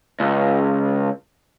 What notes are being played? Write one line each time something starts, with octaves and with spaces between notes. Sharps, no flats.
C#2